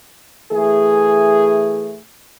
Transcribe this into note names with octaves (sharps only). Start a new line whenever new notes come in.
E3 A3 G#4